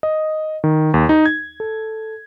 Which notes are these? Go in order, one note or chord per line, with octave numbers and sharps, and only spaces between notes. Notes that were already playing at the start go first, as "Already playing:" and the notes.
D#5
D#3
D#2
D#4
G#6
A4